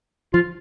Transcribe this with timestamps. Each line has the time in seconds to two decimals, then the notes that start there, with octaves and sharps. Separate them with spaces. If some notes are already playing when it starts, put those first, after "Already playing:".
0.34 F3 F4